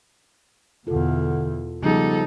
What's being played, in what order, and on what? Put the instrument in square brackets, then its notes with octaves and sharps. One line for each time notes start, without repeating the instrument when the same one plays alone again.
[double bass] E2 B2 [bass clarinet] D3 [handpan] F4 A4
[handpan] C#3 F3 G#4 [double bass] G3 [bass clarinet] B3 [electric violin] D#4 A4